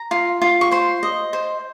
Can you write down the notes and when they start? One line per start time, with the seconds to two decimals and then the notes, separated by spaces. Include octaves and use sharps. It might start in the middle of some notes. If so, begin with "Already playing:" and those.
Already playing: A#5
0.11 F4
0.42 F4
0.61 C#6
0.71 C5 C6
1.03 D#5
1.33 C5